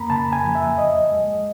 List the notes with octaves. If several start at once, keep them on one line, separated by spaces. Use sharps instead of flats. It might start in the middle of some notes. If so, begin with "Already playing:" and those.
Already playing: F2 A#3 A#5 B5
C#3 A5
G#5
F3
E5
E2 D#5
G#3